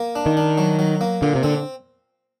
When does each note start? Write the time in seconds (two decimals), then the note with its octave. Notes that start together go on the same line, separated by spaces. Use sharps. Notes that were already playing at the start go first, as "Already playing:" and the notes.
Already playing: A#3
0.15 D4
0.26 D#3
0.37 D4
0.58 F#3
0.79 F#3
1.01 A#3
1.22 A#2 D3
1.35 C3
1.43 D3 C4